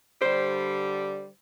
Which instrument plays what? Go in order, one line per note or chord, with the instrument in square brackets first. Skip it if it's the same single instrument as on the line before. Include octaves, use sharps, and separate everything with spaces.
[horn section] D3 G3 [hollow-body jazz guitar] C5